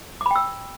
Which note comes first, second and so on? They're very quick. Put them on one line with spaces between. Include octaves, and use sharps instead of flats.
D6 B5 G5 E6